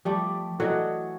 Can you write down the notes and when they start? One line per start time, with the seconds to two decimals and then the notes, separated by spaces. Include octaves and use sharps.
0.05 F3 G3 A3 D5
0.60 E3 F#3 F#4 A4 D5 D#5